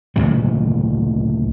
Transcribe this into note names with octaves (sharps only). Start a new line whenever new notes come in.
D2 A#2 C#3 F#3